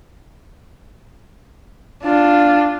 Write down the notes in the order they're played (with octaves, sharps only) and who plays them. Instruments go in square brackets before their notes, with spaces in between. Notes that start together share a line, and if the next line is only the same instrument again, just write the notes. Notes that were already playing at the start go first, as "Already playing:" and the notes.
[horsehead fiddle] D4 F4